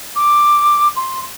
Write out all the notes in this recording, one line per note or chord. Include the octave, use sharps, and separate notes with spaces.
D6
C6